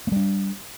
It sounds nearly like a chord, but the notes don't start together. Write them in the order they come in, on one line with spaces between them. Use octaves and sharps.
A#3 G3 D4